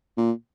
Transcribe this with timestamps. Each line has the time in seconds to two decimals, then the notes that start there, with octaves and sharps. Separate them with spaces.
0.17 A#2